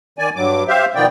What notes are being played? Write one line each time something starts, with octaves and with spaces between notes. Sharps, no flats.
D#3 D5 G#5
G2 F#3 D6
G4 C5 E5 F5
B2 D#3 F3 B3 D5 G5